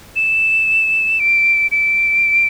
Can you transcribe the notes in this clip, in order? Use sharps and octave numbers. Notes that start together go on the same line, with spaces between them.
E7
D7
D7